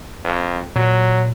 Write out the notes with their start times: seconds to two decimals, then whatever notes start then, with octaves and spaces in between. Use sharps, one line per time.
0.24 F2
0.76 A#2 F#3